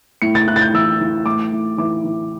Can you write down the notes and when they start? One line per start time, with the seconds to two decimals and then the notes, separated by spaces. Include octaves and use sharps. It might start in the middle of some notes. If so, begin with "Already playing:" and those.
0.22 A2 C#7
0.35 A6
0.48 A2 F#6
0.56 A6
0.61 G6
0.74 E3 E6
1.01 E3
1.26 A2 D6
1.52 A2
1.78 E3 D6
2.04 E3